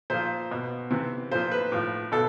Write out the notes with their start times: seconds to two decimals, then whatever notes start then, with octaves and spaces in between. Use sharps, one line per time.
0.10 A#2 F3 C5
0.51 B2
0.91 C3 E3
1.31 A#2 F3 C5
1.51 B4
1.72 A2 F3
2.12 B2 A4